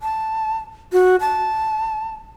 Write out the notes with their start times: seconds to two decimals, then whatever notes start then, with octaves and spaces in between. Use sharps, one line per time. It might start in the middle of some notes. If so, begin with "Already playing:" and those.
0.01 A5
0.93 F#4
1.20 A5